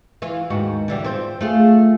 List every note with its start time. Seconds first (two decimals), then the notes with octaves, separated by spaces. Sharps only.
0.22 E3 F4
0.50 D#2 G#2 F#4
0.88 D3 E3 G3
1.04 C4 F4 C5
1.41 A3 F4 G#4